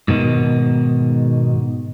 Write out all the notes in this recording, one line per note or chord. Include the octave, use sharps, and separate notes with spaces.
G#2 B2 D#3